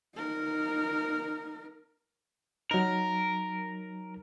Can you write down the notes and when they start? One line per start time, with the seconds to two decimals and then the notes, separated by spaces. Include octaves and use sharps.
0.15 D#4 A#4
2.71 F#3 D#4 A#4